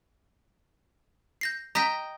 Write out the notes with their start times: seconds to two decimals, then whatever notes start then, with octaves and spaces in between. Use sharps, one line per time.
1.41 G6 A#6 C7
1.75 D#5 G5 A#5 A#6 B6